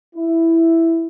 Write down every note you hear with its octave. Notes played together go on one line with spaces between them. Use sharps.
E4